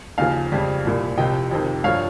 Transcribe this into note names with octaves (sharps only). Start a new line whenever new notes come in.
D#2 C#3 F3 F5 G#5
F2 C#3 G3
C2 A#2 G3
C2 C3 F3 D#5 G5
F2 C3 D#3
G2 F3 C#5 F5